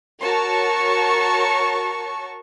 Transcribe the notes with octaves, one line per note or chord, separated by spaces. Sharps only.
F#4 A#4 C#5 A5 C#6